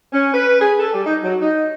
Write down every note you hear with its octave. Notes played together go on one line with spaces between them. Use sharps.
C#4
B4
G#4
A4
G3
D#4
F#3
D#4